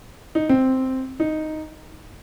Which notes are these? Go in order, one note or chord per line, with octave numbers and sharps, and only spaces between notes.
D#4
C4
D#4